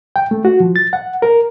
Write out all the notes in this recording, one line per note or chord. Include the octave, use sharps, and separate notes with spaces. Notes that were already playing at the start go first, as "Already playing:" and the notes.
G5
A3
F#4
F3
A6
F#5
A#4